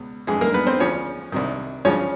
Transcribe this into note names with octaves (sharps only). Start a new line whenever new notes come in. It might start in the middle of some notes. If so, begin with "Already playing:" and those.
Already playing: C#2 B2
F2 C#3 E3 G#3 G#4
A#3 A#4
B3 B4
C4 C5
D2 C#3 F3 C#4 C#5
C2 C3 D#3
D2 C#3 F3 C#4 C#5